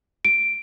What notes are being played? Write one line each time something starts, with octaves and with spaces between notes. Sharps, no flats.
D7